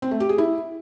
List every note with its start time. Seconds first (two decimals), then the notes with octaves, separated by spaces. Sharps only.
0.02 C4
0.11 A3
0.20 G4
0.29 G#4
0.38 E4